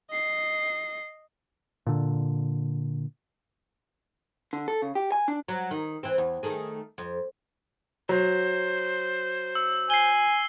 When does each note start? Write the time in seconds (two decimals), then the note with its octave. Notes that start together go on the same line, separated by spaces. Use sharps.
0.10 D#5 C7
1.87 A#2 D3
4.53 D3
4.68 A4
4.82 C#3
4.95 G4
5.12 G#5
5.28 D4
5.48 F#3
5.71 D#3
6.03 E3 C4
6.18 E2
6.43 D#3 A3 G#4
6.98 F2
8.09 F#3 C5
9.55 E6
9.90 G#5 C7 G7